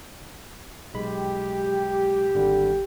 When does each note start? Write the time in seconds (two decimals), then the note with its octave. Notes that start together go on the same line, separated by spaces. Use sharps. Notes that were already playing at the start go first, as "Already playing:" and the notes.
0.94 B1 G#3 G4 B5
2.34 G#1 D3 G3